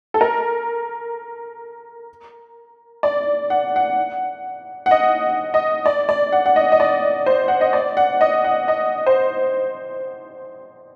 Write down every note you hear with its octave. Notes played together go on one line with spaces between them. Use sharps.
A4
A#4
D5
F#5
F#5
F#5
D#5
D#5
D5
D5
F#5
F#5
D#5
D#5
D5
C5
F#5
D#5
D5
F#5
D#5
F#5
D#5
C5